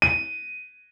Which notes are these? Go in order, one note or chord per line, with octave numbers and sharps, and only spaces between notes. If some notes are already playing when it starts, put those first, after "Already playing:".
D#7